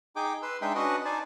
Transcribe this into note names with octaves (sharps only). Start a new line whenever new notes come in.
D#4 G#4 G5 D6
B4 C6 E6
G#3 D4 D#4 E5 G5 C6
C#4 D4 F#4 B4 D#5 F#5
D#4 C5 D5 G#5 A5